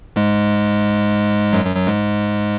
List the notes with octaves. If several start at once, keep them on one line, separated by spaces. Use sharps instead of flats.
G#2 G#3
F#2 F#3
F#2 F#3
F#2 F#3
G#2 G#3